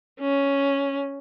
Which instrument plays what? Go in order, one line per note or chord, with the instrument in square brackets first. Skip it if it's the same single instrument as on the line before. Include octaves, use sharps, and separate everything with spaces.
[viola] C#4